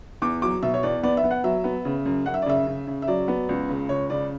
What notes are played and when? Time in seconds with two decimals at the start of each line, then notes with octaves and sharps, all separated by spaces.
0.22 E2 D6
0.42 F#3 D6
0.63 B2 E5
0.74 C#5
0.83 E2 D5
1.03 B3 D5
1.17 E5
1.24 B3
1.31 F#5
1.44 F#3 E5
1.64 B3
1.85 C#3
2.06 F#2
2.26 F#2 F#5
2.34 E5
2.42 D5
2.46 C#3 E5
2.67 C#3
2.87 C#3
3.02 E5
3.08 F#3 D5
3.28 B3
3.49 C#2
3.69 C#3
3.89 C#2 C#5
4.10 C#3 D5